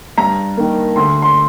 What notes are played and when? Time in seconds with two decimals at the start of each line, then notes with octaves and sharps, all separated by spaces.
0.18 G2 A#5
0.57 D#3 A#3
0.96 D2 C6
1.22 C6